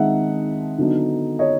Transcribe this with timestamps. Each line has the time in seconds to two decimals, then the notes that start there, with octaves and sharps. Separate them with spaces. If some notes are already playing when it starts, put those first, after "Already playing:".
Already playing: D#3 G#3 C4 D#4 E5 F#5
0.78 D3 F#3 B3 D#4
1.39 C#5 D#5